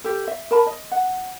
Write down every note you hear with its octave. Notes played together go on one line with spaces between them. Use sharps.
G4 A4
E5
A#4 A5 B5
D#5
F#5